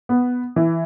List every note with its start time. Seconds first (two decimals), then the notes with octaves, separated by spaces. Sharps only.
0.09 B3
0.56 E3